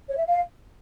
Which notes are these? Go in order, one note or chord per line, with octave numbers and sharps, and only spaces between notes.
C#5
E5
F5